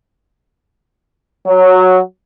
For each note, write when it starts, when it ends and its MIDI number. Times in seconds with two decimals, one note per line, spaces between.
1.47 1.99 54